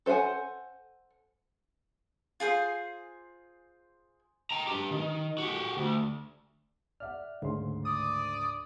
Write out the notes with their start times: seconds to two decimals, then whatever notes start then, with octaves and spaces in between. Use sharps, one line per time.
0.06 A4 C5 F5 F#5 G#5
2.40 F4 G#4 C5 C6
4.51 G5 A#5
4.67 D4 G4
4.91 D#3
5.38 F#4 G4
5.77 D2
7.00 D5 E5 F#5 F6
7.42 D2 G#2 C#3 C6
7.85 D5 D#6